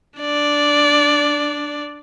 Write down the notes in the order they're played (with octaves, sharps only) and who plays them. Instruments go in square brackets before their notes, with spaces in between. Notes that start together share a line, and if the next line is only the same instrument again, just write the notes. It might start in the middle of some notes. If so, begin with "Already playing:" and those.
[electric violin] D4 D5